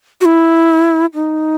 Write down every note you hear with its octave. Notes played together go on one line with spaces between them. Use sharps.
F#4
E4
D#4